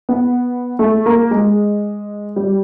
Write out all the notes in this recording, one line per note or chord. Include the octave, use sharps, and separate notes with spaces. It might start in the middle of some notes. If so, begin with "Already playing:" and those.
B3
A3
A#3
G#3
G3